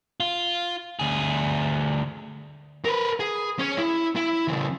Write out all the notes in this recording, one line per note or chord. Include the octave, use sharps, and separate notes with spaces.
F4
D2 G#4
A#4 B4
G#4
C#4 C#5
E4
E4
C#3 E3